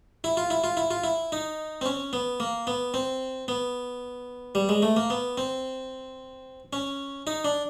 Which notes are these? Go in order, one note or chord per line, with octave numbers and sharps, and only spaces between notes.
E4
F4
E4
F4
E4
F4
E4
D#4
C4
C#4
B3
A#3
B3
C4
B3
G3
G#3
A3
A#3
B3
C4
C#4
D#4
D4